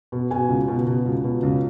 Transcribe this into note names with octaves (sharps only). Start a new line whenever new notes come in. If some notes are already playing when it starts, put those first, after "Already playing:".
B2
B2 G#5
C#2
B2
B2
C#2
B2
C#2